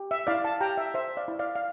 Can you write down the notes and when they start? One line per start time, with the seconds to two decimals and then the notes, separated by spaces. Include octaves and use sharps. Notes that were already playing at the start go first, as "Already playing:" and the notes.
Already playing: G4
0.11 E5
0.27 E4 D5 F5
0.44 F5 A5
0.60 G4 G5 A#5
0.78 E5
0.94 C5 E5
1.17 D5 F5
1.28 E4
1.39 D5 F5
1.56 F5